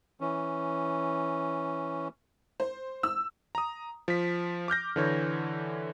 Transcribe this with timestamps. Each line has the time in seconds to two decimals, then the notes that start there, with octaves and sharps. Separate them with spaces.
0.20 E3 C#4
2.60 C5
3.03 E6
3.55 A#5 D#6
4.08 F3 B6
4.68 D6 F6 G6 A#6
4.96 D3 E3 C#5